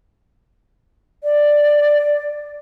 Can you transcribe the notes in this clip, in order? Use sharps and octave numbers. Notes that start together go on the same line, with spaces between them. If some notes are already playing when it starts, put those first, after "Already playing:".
D5